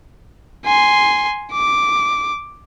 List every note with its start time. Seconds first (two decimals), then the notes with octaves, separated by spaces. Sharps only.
0.66 G#5 C6
1.52 D6